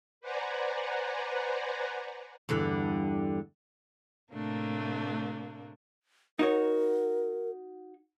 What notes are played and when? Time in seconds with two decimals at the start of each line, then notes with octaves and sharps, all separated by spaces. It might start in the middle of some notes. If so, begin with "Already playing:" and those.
0.21 B4 C5 D5 F#5 G#5 A#5
2.49 E2 G2 D3
4.32 A2 C3 A3 A#3 D4
6.39 D#4 F#4 A#4 C#5